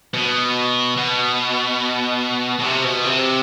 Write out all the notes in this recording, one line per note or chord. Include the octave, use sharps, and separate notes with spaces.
B2
B2
B2
C3
B2
C3